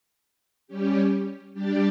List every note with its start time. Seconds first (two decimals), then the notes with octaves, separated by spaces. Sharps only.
0.68 G3 C#4 G4
1.54 G3 D4 G4 D5